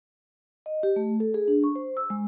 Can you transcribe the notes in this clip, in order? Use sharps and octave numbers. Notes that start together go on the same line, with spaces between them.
D#5
G4
A3
A4
G#4
D4
C#6
C5
E6
G#3